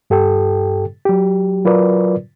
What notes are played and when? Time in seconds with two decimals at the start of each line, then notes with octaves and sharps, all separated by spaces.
0.10 G2 G4 A4 G5
1.05 F#3 G4
1.65 F#3 F4 A#4 B4 D5